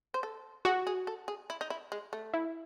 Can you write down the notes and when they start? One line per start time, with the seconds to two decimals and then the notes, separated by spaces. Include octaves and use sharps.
0.14 C5
0.23 A4
0.65 F#4 G#4
0.87 G#4
1.07 A4
1.28 G#4
1.50 E4
1.61 D#4
1.70 E4
1.92 G#3
2.13 A3
2.34 E4